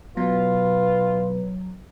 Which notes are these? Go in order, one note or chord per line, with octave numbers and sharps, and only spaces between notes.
B2 F#3 F4 B4